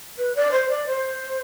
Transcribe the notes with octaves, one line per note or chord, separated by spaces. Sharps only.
B4
D5
C5
D5
C5